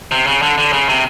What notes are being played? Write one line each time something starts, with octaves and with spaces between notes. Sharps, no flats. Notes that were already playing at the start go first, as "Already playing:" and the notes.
C3
C#3
D3
D3
C#3
C3